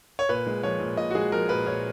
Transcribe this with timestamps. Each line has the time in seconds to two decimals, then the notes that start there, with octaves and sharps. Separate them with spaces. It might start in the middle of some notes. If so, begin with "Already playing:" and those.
0.19 C#5
0.29 A#2 B4
0.47 G#3
0.63 F3 C#5
0.80 A#2
0.97 A#2 D#5
1.11 F#4
1.15 G#3 G#4
1.32 F3 A#4
1.49 A#2 B4
1.66 A#2 C#5